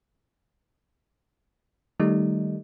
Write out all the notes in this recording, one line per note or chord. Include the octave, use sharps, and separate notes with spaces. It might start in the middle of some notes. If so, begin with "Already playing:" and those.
D#3 G3 A3 D#4